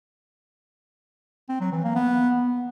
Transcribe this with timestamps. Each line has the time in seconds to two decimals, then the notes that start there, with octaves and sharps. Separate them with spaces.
1.49 C4
1.61 F#3
1.72 E3
1.84 A#3
1.96 B3